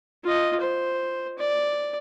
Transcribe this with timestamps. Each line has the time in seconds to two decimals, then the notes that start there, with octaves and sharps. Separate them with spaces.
0.24 F4 D#5
0.61 C5
1.38 D5